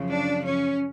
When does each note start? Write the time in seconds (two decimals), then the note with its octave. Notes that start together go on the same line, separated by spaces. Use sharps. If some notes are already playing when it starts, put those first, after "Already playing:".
Already playing: F#2 C#3 F3
0.08 D4
0.44 C#4